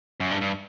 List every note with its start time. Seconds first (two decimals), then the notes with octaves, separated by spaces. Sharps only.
0.20 F#2
0.31 G2
0.41 G2